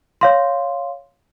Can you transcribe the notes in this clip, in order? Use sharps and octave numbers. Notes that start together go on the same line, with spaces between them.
C#5 F5 C6